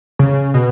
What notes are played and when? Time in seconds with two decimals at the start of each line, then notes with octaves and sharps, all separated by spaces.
0.19 C#3
0.54 B2